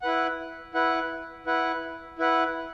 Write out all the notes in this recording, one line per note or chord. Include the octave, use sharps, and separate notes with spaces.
E4 B4 F#5
E4 B4 F#5
E4 B4 F#5
E4 B4 F#5